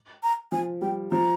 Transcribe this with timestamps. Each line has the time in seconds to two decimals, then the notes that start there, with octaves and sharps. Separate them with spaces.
0.23 A#5
0.52 F3 G#5
0.82 G3 G5
1.12 F3 A#5